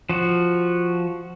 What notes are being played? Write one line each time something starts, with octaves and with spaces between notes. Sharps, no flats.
F3 F#4